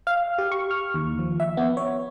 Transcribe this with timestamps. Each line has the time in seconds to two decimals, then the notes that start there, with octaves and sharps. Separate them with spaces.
0.07 F5
0.38 G4
0.52 C#6
0.71 F6
0.94 D#2
1.19 F3
1.40 E5
1.57 B3
1.77 C#5